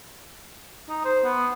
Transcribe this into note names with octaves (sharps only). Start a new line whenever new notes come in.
D#4
C5
B3